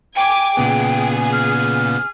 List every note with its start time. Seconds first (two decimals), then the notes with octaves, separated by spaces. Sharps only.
0.16 G5 G#5 D6
0.57 A#2 C#3 B3 G#4
1.32 F6